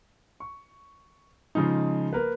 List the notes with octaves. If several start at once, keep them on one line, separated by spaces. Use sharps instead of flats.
C#6
C#3 F3 G#3 D#4
A#3 A#4 B4